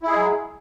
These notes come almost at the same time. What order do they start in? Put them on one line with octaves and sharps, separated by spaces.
E4 G#4 G#3 F#3